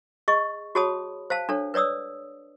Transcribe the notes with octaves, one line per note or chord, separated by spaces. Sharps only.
G#4 D#5 C#6
F#4 G#4 C#5 A5 B5 D#6
C5 F5 A5
D4 A4 C#5
B4 C#5 D5 D#6 E6